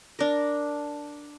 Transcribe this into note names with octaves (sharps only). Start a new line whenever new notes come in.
D4 A#4